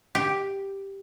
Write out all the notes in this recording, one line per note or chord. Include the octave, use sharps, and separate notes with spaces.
G4